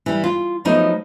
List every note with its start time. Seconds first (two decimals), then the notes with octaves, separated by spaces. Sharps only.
0.06 E3 G3
0.24 F4
0.65 F3 F#3 A3 B3 D#4